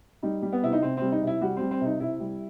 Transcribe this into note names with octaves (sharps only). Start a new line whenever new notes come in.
G3 D#4
G3
B3
C3 E4
D#4
C3 C4
G3 C4
D#4
C3
E4
G3 F#4
G3 C4
C4
C3 D#4
C3 E4
G3